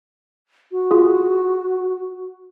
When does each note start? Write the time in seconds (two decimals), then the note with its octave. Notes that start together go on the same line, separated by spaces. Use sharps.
0.72 F#4
0.91 F4 G#4